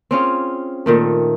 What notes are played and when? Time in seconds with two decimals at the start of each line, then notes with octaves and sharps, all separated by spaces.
0.11 C4 C#4 F4 G#4
0.86 A#2 D#3 A3